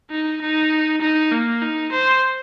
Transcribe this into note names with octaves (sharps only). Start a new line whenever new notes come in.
D#4
D#4
D#4
A#3
D#4
C5